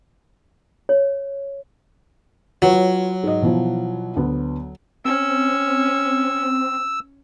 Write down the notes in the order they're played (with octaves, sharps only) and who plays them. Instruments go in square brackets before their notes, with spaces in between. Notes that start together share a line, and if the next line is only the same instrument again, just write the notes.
[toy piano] C#5
[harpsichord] F#3 [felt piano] F4 B4 C#5
[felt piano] G#2 D#5
B2 E3 F3
D2 B3
[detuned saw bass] C4 [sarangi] C#4 [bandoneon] E6